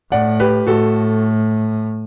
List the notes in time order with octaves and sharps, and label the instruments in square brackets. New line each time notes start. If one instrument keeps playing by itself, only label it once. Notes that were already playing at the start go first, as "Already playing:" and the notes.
[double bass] A2 [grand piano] D5 F#5
[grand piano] G4 B4
[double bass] A2 [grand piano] F#4 A4